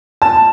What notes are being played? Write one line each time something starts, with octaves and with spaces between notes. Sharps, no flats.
A5